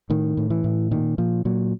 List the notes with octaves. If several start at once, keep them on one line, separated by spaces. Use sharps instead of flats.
A2 D#3
A2
E3
A2
A#2 D#3
A#2 F3
A#2 F#3